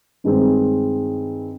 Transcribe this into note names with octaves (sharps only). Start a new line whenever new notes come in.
G2 D#3 G#3 C4